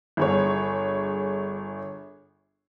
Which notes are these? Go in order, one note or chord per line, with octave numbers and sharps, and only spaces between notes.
G1 G#4 C#5